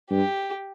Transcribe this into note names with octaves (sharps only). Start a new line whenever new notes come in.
G2 G4